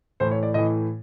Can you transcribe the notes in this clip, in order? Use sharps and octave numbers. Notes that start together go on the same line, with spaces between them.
A2 E3 C5
C#5
D5
A2 E3 D#5